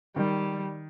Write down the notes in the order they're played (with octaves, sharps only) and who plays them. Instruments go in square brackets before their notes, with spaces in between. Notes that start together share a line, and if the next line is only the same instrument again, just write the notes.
[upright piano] D#3 [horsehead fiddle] G3